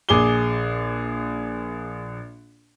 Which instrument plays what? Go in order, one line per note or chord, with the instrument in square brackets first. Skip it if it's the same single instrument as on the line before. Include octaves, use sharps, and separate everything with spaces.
[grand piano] A#1 G#4 D6 G7